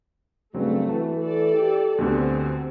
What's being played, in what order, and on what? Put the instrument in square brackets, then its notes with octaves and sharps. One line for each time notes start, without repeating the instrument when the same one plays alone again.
[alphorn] G2 [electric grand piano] C#3 F#3 C4 [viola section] A3
[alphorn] E3 [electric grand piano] F#4 A5
[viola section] A4 D5
[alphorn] G4
[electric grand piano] D2 B2 D3 [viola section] C4 [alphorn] G4